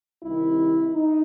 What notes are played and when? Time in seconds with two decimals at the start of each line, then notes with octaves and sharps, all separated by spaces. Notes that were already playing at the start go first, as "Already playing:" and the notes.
0.23 C2 C3 D#3 E4
0.93 D#4